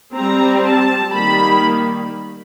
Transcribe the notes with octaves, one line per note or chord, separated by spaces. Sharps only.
G3 C4 A#5
A5
D#3 G3 A#3 B5